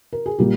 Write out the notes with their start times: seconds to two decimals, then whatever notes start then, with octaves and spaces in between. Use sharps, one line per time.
0.13 A#4
0.26 G#4
0.39 A#2 G3 A#3 G4